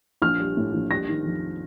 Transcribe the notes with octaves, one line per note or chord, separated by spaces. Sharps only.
A#1 F6
G3
A2
A#1
G3 A#6
D#3
F2